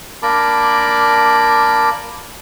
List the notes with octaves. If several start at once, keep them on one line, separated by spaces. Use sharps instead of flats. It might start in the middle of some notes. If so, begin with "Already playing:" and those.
A#3 D4 A#4 A5 B5 D6